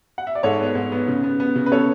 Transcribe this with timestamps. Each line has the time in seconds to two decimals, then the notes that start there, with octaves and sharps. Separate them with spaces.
0.18 F#5
0.27 E5
0.35 D5
0.43 G#2 A4 C#5
0.59 B3
0.75 G#2
0.92 B3
1.08 C#3
1.23 B3
1.40 B3
1.55 C#3
1.66 B4
1.72 B3 A4 C#5